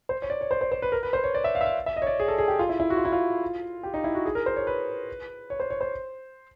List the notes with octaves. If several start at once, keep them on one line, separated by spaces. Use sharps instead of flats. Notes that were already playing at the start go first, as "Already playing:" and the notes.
C5
C#5
D5
C#5
C5
C5
C5
B4
A#4
B4
C5
C#5
D5
E5
F5
E5
F5
E5
D#5
C#5
D5
G#4
A4
G#4
G4
F4
E4
E4
F#4
F4
E4
F4
G4
D#4
E4
F#4
G#4
A#4
C5
C#5
B4
C#5
C5
C#5
C5